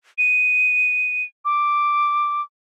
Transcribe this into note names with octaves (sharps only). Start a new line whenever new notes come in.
D#7
D6